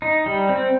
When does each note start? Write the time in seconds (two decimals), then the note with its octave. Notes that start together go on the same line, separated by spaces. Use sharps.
0.02 D#4
0.26 G3
0.49 C4